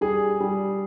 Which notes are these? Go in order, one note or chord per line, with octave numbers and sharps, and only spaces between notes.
G3 G#4
G3